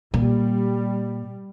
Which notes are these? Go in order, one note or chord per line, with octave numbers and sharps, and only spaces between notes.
A#2 G3